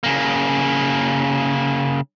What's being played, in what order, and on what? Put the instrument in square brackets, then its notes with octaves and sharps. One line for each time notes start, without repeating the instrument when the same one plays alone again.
[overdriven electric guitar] C#3 A#3